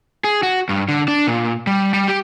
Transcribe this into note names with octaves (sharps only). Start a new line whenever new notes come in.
G#4
F#4
G2
D3
D4
A#2
G3
G3
G4